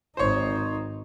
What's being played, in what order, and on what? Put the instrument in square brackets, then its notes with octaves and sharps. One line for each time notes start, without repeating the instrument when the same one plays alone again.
[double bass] G#1 D#4 [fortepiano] C5 C#5